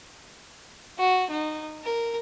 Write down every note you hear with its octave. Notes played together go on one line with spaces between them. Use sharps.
F#4
D#4
A#4